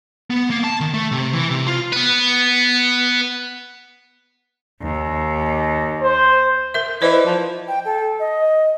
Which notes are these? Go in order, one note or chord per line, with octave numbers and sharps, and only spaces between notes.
B3
A#3
A5
D#3
A3
C3
E3
C3
F4
B3 B4
D#2
C5
A#4 E5
E3 C5 D5 D#5
F3
G5
A4
D#5